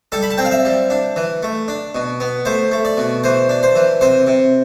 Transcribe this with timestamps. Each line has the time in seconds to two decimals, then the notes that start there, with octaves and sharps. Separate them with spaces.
0.12 G3 A4
0.23 B5
0.31 A5
0.38 C4 G5
0.45 F5
0.51 E5
0.65 G3
0.90 D4
1.16 E3
1.43 A3
1.68 D4
1.95 B2
2.20 B3
2.45 A3 C5
2.72 A3
2.85 D5
2.97 B2
3.24 E3 C5
3.49 D4
3.63 C5
3.75 E3
4.01 C3 C5
4.27 C3